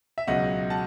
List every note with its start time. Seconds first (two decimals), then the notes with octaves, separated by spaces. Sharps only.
0.18 E5
0.27 C#2 B2 F#3 D#5 F#5
0.70 F#5 A5